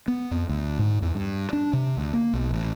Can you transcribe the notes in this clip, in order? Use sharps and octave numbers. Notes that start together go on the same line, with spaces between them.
B3
F2
D2
G#2
E2
G2
D4
C3
D2
A#3
B1
A1